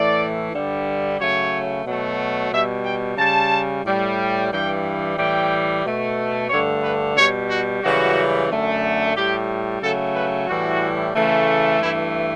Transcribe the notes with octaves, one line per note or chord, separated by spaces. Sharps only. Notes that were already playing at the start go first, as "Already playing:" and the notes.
Already playing: A2 E3 A3 D5
G2 D3 G3
C#3 F#3 A3 C#5
B2 F#3 A3
B2 G3 E5
G5
C#3 G3 A5
A2 G3
G2 E3 G3 G5
A2 E3 G3 G5
B2 A3
G2 D3 A3 C#5
B4
B2 G3 C#5
F#4
F#2 C#3 E3 G3 F#4
F#2 D3 A3
A2 G3 G4
C#3 F#3 A3 A4
B4
A2 E3 G3 F#4
C#3 E3 A3
G2 E3 A3 E4